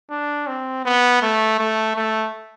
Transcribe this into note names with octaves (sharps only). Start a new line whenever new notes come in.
D4
C4
B3
A3
A3
A3